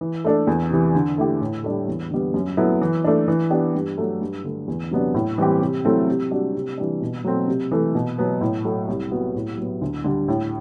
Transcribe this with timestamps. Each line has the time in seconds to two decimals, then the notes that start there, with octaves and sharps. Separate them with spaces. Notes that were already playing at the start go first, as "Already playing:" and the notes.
0.01 E3
0.25 A3 D4 A4
0.47 E2
0.70 C3 E3
0.95 D3
1.18 A3 E4 G4
1.41 A2
1.64 G3 D4 A4
1.88 E2
2.11 D3 G3 B3
2.34 F#2
2.57 F#3 B3 E4 A4
2.82 E3
3.04 A3 D4
3.28 E3
3.50 B3 D4 G4
3.75 G2
3.98 F#3 A3
4.21 G2
4.44 D3 A3
4.68 E2
4.91 C3 F#3 B3 D4
5.14 A2
5.38 E3 G3 C4 G4
5.62 C3
5.85 F#3 A3 C4 E4
6.08 C3
6.31 G3 D4 F#4
6.55 C3
6.78 E3 G3 D4
7.02 B2
7.24 F#3 A3 C4
7.48 C3
7.71 E3 A3
7.95 B2
8.18 F#3 B3
8.41 A2
8.65 F#3 A3
8.88 C2
9.11 C3 F#3 B3 F#4
9.35 A2
9.58 F#3 B3
9.82 D2
10.04 D3 G3
10.28 A2